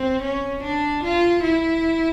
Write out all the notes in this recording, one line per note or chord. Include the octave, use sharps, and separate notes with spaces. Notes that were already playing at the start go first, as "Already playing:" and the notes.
Already playing: C4
C#4
D4
F4
E4